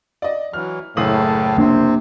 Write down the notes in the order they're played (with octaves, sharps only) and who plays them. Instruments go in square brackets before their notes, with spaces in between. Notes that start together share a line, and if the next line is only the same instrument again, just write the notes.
[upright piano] D5 D#5
[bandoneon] E3 F#3 [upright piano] F6
[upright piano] F#1 D#6 F#7 [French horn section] A2 [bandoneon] G#4 A4 F5
[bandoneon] C3 C4 [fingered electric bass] A#3 D4